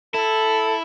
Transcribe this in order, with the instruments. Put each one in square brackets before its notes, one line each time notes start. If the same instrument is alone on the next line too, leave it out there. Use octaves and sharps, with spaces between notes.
[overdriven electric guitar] E4 [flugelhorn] A4